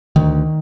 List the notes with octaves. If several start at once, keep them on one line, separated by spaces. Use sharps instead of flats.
D2 D#3